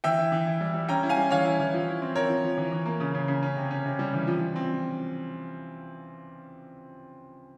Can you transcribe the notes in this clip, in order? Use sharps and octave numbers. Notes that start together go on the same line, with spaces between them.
E3 E5 G5
E4
E3
E4
G3
G3
C#4 G5 A#5
E4
F5 G#5
G3
E3 C#5 F5
E4
E3
F3
E4
C4
C4 A#4 C#5
F3
F3
E3
E3
A#3
C#3
C#3
C#3
C#4
C3
C#4
C3
G3
E3
F3
F3
C4